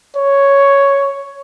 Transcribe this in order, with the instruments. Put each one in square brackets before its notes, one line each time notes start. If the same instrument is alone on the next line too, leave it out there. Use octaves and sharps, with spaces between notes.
[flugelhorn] C#5